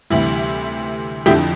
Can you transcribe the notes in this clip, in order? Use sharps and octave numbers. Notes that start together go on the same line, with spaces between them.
D2 C3 E3 G3 E4
F2 D3 F3 E4 G4